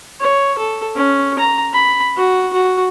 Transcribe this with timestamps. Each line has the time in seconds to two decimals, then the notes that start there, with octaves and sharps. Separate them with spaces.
0.20 C#5
0.58 A4
0.96 C#4
1.39 A#5
1.73 B5
2.17 F#4
2.53 F#4